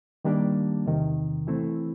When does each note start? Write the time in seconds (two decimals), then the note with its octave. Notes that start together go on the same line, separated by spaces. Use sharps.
0.25 D#3 G3 A#3 D4 G4
0.86 E2 C3 D#3
1.47 E3 A3 C4 E4